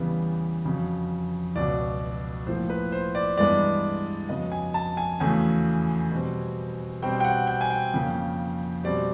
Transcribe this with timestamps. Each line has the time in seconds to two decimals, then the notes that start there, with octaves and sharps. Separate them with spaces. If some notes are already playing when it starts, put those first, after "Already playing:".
Already playing: E2 C#3 E3 G3 B3
0.65 F2 C#3 F#3
1.56 C#2 B2 F#3 D5
2.47 A2 F3 A#3 C5
2.70 B4
2.92 C5
3.15 D5
3.38 G2 E3 G#3 B3 D5
4.29 F2 C#3 F#3 B3 D#5
4.52 G#5
4.74 A5
4.97 G#5
5.20 E2 C#3 F#3 A3 G#5
6.11 B2 G3 C4
7.02 B2 G3 C4 G5
7.20 G5
7.25 F#5
7.47 G5
7.61 G#5
7.70 G5
7.94 F2 C#3 F3 A#3
8.84 B2 G3 C4 D5